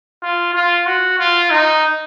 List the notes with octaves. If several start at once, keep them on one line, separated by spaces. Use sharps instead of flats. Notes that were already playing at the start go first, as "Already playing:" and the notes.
F4
F4
F#4
F4
D#4